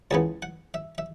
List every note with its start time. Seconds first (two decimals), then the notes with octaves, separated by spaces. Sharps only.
0.11 C#2 C#3 E3 B3 A5
0.42 F#5
0.74 E5
0.98 E5